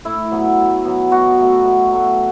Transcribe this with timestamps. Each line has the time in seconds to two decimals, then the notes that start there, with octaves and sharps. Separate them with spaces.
0.05 A2 E4
0.31 F#3 B3
0.58 A2
0.85 F#3 B3
1.11 B2 F#4
1.38 F#3 A3
1.64 B2
1.91 F#3 A3